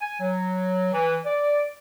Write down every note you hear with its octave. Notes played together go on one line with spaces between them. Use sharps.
G#5
F#3
E3
D5